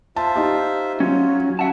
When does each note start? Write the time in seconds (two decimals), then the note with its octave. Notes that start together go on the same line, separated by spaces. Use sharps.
0.16 F4 C5 E5 A5
0.36 D#4 G4
1.00 F#3 C#4 F4
1.59 F#4 E5 F#5 A5